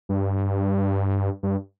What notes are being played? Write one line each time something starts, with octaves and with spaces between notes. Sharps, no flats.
G2
G2